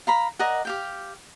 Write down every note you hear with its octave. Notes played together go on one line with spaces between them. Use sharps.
F5 A#5 B5
A#4 D5 D#5 F#5
G4 F5 G5